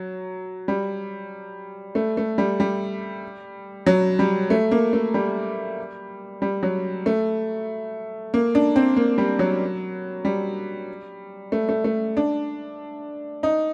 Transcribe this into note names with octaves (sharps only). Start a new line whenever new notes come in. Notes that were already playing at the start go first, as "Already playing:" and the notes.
Already playing: F#3
G3
A3
A3
G3
G3
F#3
G3
A3
A#3
A3
G3
G3
F#3
A3
A#3
D4
C4
A#3
G3
F#3
G3
A3
A3
A3
D4
D#4